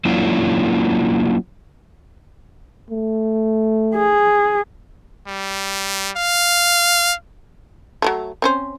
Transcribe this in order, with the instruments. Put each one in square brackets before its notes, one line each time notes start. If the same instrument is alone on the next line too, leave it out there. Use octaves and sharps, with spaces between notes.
[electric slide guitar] F#3 A#3 C#4 D4 E4 F4
[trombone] A3
[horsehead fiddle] G#4
[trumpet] G3
F5
[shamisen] F#3 G3 A3
C4 C#4 C5